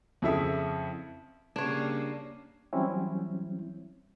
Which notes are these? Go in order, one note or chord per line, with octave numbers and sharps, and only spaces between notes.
F2 C#3 E4 A4 E5 D#6
C#3 G3 A#3 D4 C#5
E3 F#3 G3 C4 C#4 E4